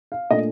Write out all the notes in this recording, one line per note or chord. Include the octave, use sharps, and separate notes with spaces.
F5
A#2 A3 D4 D#5